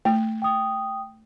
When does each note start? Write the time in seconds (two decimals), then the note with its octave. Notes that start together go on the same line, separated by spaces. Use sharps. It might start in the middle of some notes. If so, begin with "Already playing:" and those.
0.05 A3
0.42 G5 D#6